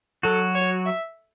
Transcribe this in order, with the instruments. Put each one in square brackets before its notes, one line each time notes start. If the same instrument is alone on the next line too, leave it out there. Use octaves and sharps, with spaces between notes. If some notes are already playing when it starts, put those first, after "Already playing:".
[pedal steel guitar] F#3 F#4 [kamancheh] A4
[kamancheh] C#5
E5